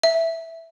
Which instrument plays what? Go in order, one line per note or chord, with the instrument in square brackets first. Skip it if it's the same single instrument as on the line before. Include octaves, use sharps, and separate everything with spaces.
[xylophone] E5